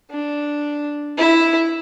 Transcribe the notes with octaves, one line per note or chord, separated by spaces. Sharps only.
D4
E4